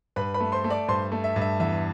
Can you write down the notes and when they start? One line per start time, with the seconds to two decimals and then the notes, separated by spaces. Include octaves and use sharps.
0.16 G2 B4 B5
0.34 B4 B5
0.40 A3
0.52 C5 C6
0.64 A3
0.70 D5 D6
0.88 G2 C5 C6
1.12 A3
1.24 E5
1.36 G2
1.41 E5
1.60 E2 E5